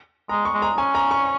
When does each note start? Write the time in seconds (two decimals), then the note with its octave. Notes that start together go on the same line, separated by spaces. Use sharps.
0.29 G#3 A#5
0.45 C#6
0.54 G#3
0.62 A#5
0.78 C#4 G#5
0.95 A#5
1.11 C#6